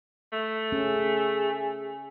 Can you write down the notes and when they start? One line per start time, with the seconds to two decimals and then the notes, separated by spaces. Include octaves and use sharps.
0.32 A3
0.72 C#4 G#4